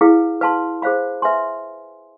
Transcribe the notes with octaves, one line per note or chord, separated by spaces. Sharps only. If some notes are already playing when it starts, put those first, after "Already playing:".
E4 G#4 B4 F5
B4 F5 A5 C6
G#4 C5 F5 B5
B4 E5 G#5 C6